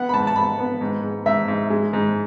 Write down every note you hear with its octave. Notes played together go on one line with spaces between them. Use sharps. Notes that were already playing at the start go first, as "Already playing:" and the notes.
Already playing: B3 F#5
B5
G#2 A5
A5
G#2 B5
B3
G#2
G#2
G#2 E5
G#2
G#3
G#2